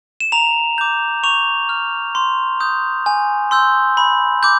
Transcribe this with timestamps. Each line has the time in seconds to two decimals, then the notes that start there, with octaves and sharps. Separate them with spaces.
0.20 E7
0.32 A#5 F7
0.78 D6 G6
1.23 C#6 F7
1.69 F6
2.15 C6
2.60 D#6 G6
3.06 G#5
3.51 C6 E6 G6
3.97 B5
4.43 D6 G6